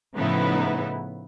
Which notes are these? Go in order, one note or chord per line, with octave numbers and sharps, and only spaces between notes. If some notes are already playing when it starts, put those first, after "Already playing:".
A2 C#3 F3 B3 D#4 E4